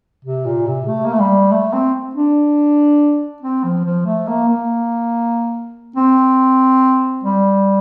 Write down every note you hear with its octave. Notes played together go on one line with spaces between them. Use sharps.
C3
A#2
C3
A3
A#3
A3
G3
A3
C4
D4
C4
F3
F3
A3
A#3
A#3
C4
G3